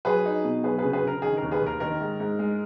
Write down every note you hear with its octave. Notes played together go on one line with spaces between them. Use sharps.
F#3 G#4 B4
D#4
B2
F#3 G#4 B4
G#4 B4
C#3
G#4 B4
C#3 A#4
D#3 G#4
D#2 A#4
G#4 B4
D#2 A#4
D#3 A#4
G#2
G#2
G#3